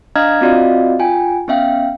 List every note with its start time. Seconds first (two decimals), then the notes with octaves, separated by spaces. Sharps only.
0.16 D4 D#5 F5 A#5 F6 G#6
0.41 C4 F4 F#4 D5 D#5 F5
0.99 F4 G5 G#5
1.48 B3 C#4 E5 F5 G5